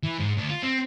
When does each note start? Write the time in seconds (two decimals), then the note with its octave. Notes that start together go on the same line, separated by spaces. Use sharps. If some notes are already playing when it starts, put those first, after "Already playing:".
0.03 E3
0.19 G#2
0.38 D2
0.50 F4
0.63 C4